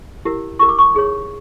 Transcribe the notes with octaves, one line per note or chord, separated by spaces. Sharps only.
E4 G4 A#4
E4 G4 A#4 C#6
D6
C#6
D#4 G#4 C#5